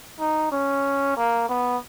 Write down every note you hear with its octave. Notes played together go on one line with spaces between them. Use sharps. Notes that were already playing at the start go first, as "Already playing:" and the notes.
D#4
C#4
A#3
B3